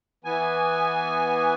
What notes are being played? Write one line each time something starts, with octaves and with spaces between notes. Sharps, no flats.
E3 B3 G#5